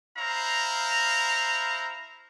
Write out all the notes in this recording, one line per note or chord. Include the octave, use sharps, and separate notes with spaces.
E4 C5 F5 A#5